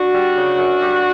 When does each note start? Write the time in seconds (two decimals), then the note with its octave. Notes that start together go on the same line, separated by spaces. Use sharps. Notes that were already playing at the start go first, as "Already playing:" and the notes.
Already playing: D4 F#4
0.14 G3
0.36 C#3
0.58 F#2
0.81 G3